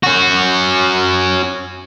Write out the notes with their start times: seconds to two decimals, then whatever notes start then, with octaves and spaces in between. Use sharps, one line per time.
0.04 C#4 F#4